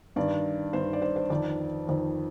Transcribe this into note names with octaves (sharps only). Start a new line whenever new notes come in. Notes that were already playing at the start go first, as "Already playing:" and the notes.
G2 D#3 D5
G2 D#3 C5
D5
C5
C5
F2 D#3 D5
F2 D#3